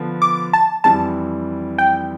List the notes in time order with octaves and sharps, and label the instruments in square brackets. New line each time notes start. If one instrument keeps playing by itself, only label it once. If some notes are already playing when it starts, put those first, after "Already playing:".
Already playing: [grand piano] D3 F3 B3
[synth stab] D6
A5
[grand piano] F2 E3 G3 [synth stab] A5
[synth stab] G5